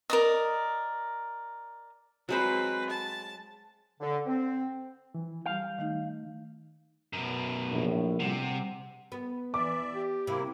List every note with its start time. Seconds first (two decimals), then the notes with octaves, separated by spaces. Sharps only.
0.10 A#4 D5 D#5
2.29 F#3 G#3 C4 B4 C5
2.90 A5
4.01 D3
4.26 C4
5.14 E3
5.46 G3 F5 G6
5.79 D#3 A3 D#4
7.13 F#2 B2
7.71 A#1 A2
8.20 C3 G3 F#5
9.12 B3
9.54 E3 D5 E5 D6
9.93 G4
10.27 C3 A#3 E4